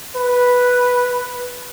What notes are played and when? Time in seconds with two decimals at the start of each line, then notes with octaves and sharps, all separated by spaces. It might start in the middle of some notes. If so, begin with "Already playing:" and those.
0.17 B4